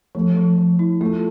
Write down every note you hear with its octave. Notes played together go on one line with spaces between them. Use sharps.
F3 A3
F3
F3
E4
A3 F4